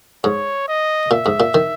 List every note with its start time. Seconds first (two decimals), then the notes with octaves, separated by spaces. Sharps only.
0.24 G#2 C#5
0.68 D#5
1.11 A#2 E5
1.26 G#2
1.40 A#2
1.54 D#3